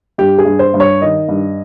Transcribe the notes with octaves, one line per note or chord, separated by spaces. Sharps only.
G2 G4
G#4
G2
C5
G2
C#5
D#3 D#5
G2